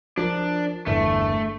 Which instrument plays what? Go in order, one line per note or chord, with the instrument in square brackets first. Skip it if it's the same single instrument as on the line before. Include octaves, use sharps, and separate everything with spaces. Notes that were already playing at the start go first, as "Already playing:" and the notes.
[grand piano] F3 A#4 [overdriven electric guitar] D4
[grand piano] G1 E2 G2 [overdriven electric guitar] A3